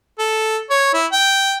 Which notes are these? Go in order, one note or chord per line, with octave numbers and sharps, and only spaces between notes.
A4
C#5
E4
G5